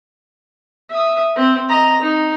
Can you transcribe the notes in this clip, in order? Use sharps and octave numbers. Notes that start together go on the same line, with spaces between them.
E5 D#6
C4
D#5 A#5
D#4